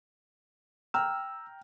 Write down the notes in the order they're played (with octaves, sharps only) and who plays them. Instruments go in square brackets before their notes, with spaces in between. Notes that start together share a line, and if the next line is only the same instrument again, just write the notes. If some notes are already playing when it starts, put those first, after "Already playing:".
[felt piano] G5 A#5 F6 [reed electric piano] E6